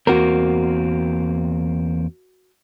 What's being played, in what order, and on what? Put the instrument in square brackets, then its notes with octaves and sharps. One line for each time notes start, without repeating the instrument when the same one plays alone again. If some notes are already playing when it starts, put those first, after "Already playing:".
[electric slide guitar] E2 A#3 C4 [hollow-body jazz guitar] F#4 A#4